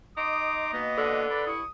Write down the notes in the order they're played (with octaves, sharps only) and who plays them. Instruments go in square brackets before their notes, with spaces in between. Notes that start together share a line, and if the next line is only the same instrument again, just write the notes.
[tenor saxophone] D#4 [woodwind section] D#5 C6 D6 [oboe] D#6
[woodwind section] B2 A#3 B3 [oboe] D#5
[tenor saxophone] D3
[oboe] B4 [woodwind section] D5
[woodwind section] G2 E4 C#6 [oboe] D#6